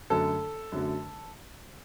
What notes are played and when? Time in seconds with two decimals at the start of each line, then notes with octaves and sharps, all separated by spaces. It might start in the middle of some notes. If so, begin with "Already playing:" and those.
0.10 F#2 D3 F#3 A3 A4
0.72 F#2 D3 F#3 A3